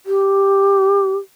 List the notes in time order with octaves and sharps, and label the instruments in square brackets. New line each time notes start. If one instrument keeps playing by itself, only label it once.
[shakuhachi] G4